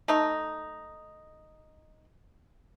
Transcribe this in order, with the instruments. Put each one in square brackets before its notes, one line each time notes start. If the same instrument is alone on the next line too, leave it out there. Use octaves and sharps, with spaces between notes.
[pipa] A3 D#4